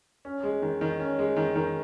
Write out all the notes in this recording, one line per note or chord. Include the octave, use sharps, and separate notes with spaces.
C#4
G#3
D#3
D#3
C#4
G#3
D#3
D#3